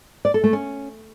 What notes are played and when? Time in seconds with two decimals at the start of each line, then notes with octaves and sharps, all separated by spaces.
0.25 D5
0.34 A4
0.44 A3
0.53 C#4